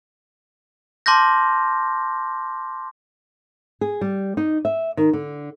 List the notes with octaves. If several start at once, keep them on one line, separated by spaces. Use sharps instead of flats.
A5 C6 D6 F6 G6 A#6
G#4
G3
D#4
E5
D#3
D3